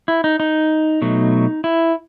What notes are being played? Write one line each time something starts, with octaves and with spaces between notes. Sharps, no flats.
E4
D#4
D#4
B2 F#3 A3
E4